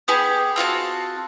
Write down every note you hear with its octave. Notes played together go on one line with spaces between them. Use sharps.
B3 G4 G#4
C4 F4 F#4 A5